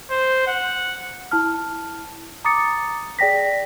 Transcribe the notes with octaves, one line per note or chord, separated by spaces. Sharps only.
C5
F#5
E4 A5 F6
A#5 D6 D#6 A6 C#7
G#4 D5 G5 A#6 B6